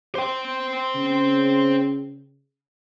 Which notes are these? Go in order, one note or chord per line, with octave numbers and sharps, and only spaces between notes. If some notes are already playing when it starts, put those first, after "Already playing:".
C5 G5
C#3